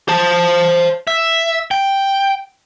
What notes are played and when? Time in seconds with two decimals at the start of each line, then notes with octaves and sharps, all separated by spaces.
0.08 C5 A5
1.07 E5
1.71 G5